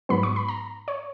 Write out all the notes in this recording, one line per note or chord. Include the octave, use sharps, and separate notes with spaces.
G#2 F#3 B3 B5
C#6
B5
A#5
C#5